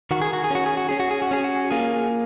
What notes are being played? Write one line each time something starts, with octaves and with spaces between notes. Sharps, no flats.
D#3 F#4
G#4
F#4
G#4
C#4 F#4
G#4
F#4
C#4 G#4
F#4
G#4
F#4
C#4 G#4
F#4
A#3 F4 G#4